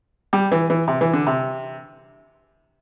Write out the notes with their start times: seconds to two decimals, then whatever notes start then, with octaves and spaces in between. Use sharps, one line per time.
0.33 G3
0.52 E3
0.70 E3
0.88 C3
1.01 E3
1.13 D3
1.27 C3